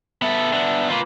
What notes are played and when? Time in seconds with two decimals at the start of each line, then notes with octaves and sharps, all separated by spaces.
0.22 B3 A4 E5
0.53 B3 D4
0.89 A#3 F4 B4